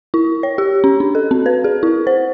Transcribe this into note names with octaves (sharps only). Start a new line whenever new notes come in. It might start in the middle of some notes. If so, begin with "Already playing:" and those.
E4
C#5
G4
C#4
D4
A4
C4
B4
G#4
E4
C5